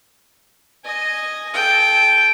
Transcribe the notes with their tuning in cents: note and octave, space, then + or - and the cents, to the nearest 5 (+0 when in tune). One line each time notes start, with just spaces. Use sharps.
D#5 -5 G#5 +0
A4 -30 G5 +0